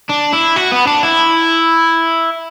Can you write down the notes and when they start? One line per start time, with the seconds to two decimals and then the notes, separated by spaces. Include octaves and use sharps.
0.09 D4
0.33 E4
0.56 F#4
0.72 B3
0.87 D4
1.03 E4